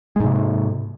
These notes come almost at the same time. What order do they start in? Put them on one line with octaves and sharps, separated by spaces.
G#3 G#2 C3